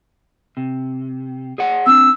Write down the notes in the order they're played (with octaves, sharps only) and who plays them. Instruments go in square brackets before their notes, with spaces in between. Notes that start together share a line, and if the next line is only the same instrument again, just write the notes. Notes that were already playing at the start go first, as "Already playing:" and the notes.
[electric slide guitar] C3
G#4 C#5 F#5
[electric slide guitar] C4 D4 [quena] E6